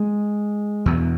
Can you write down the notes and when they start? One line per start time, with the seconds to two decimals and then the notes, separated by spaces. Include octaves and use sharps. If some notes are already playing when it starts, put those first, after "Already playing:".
Already playing: G#3
0.86 E2 B2